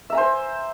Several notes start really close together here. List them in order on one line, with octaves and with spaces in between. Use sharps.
E5 A#5 G#5 C5